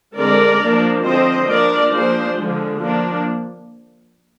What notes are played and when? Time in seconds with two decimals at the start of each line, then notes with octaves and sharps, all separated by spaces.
0.16 D3 G#3 C4 A#4 D5
0.61 F3 A#3 D4
1.04 D3 F3 C4 C5 D#5
1.48 F3 A#3 D4 A#4 D5
1.92 F3 A#3 D4 G#4 C5
2.35 D3 F3 G#3
2.79 F3 A#3 D4